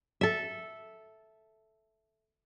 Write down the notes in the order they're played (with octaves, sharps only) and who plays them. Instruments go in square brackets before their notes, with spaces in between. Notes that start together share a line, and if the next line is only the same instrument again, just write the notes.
[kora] A4 E5